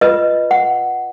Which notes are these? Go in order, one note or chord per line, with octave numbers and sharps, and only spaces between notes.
F4 B4 D#5
F#5